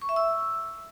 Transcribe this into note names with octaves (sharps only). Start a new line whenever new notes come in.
C#6
E5
E6